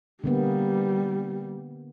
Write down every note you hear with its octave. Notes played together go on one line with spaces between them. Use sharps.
D3 G3 A#3 B3